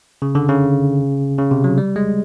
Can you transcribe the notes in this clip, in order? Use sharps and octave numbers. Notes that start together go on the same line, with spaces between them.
C#3
D3
C#3
C#3
C3
F#3
G3
G#3